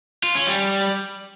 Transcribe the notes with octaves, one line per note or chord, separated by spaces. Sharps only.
F4
C#4
G3